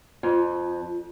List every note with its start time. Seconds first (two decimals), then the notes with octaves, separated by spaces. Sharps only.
0.23 F2